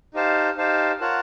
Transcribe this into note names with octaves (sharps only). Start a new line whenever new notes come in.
D#4 G4 C5 F5 A5
D#4 G4 C5 F5 A5
F4 A#4 C#5 F#5 A5